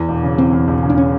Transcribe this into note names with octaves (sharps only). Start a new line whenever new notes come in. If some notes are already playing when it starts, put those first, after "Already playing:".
Already playing: E2 E3
E1
C#3
E3 C4
E2
E1
C#3
D4
C#4